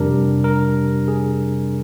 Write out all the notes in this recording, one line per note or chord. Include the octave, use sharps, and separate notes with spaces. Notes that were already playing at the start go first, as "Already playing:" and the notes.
Already playing: F2 C3 G3 D4 A#4
A#4
G#4